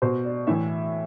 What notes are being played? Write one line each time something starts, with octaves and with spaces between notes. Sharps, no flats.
B2 C5
D5
A2 E3 E5